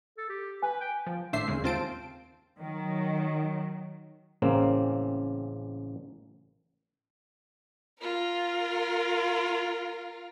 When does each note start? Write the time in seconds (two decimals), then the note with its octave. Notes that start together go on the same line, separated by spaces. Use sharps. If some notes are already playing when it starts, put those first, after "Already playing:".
0.17 A4
0.29 G4
0.63 B4 G#5
0.81 G5
1.07 F3
1.33 G#1 A2 D4 C5 E5 C7
1.48 A#1 D#2 C#3 G#3
1.63 D#2 C4 F4 C5 A5 D7
2.60 D#3 F#3
4.42 A1 C#3 A#3 C4
8.00 F4 A#4